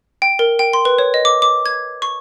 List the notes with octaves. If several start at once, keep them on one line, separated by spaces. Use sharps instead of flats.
G5
A#4
G5
C6
B4
C#5
D#5
D6
D6
G#6
C#6